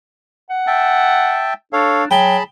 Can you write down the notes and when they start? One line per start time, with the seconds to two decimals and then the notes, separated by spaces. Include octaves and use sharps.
0.50 F#5
0.67 E5 G5 A5
1.73 D4 A4 C#5 F5
2.11 F#3 G#4 G5 A5 B5